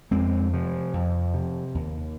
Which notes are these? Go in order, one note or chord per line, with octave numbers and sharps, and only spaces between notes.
F2 G#3 C4
C3 F3
F2
C3
D#2